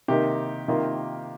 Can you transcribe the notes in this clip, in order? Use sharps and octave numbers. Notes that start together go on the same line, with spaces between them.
C3 D#3 A#3 D#4 G4
C3 D#3 A#3 F4